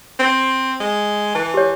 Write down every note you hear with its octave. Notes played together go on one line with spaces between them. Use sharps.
C4
G#3
E3 A5
G4 C#5